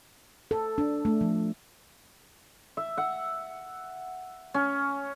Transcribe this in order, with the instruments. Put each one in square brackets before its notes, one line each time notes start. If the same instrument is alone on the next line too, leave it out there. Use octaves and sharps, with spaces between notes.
[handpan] A4
D4
A3
F3
[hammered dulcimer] E5
F#5
C#4